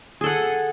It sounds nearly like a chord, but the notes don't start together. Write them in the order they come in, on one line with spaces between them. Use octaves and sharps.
G#4 A4 F#5